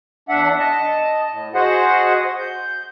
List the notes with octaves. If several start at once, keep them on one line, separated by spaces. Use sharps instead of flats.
E2 D4 E5 F#5
D#5 A5
A2
F#4 G#4 C5 D#5 F#5
G6